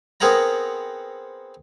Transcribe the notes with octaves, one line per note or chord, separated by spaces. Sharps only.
B3 C4 G#4 A#4 F#5 A#5